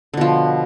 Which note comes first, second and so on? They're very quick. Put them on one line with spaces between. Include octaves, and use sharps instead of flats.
D3 B2 F3